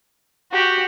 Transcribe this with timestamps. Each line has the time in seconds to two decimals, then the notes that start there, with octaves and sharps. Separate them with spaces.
0.53 F#4 G4